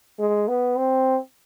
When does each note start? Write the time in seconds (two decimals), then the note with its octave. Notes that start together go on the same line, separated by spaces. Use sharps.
0.19 G#3
0.48 B3
0.78 C4